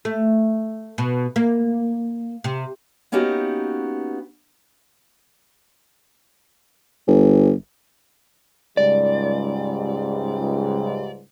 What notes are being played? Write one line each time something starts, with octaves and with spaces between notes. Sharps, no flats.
A3
B2
A#3
C3
A#3 B3 C#4 D#4 F#4 G4
G1
C#2 G#2 G3 D5